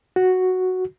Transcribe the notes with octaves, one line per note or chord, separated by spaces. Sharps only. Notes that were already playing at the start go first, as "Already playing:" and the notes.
F#4